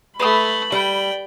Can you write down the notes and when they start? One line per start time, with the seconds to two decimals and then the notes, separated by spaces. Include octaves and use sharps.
0.20 A3 B4 B5 D#6
0.72 G3 G5